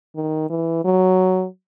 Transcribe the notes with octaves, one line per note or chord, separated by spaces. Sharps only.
D#3
E3
F#3